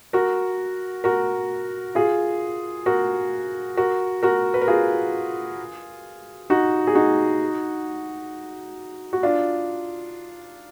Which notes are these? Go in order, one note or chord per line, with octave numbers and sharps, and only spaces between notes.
F#4 A#4
F#4 A#4
F4 G#4
F#4 A#4
F#4 A#4
F#4 A#4
B4
A#4
F4 G#4
D#4 F#4
G#4
D#4 F#4
F#4
D4 F4